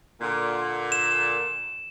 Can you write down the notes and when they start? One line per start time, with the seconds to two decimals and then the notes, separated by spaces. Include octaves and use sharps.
0.21 A#2 D3
0.92 E7